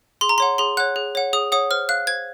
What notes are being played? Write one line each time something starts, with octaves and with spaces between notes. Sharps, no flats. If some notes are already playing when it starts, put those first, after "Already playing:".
G#4 C6
A#5
C#5 F#5 C6
G#4 C6
C#5 F#5 F#6
G#4
C#5 F#5
G#4 D#6
C#5 F#5 D#6
C5 F6
F5 F#6
C5 G#6